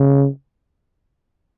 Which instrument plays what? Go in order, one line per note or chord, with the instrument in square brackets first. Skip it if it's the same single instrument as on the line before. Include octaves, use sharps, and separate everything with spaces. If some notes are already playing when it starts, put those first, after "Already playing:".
Already playing: [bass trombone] C#3